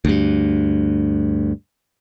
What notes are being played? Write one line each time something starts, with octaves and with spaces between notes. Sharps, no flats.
D2 G2